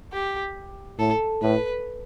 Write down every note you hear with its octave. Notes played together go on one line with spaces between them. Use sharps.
G4
A2 A4
A2 B4